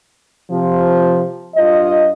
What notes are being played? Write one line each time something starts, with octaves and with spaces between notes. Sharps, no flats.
C3 F3
G2 F4 D#5